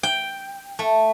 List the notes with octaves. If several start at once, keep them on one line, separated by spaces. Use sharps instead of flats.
G5
A3